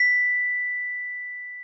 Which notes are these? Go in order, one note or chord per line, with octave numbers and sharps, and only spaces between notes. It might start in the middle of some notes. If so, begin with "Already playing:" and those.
Already playing: B6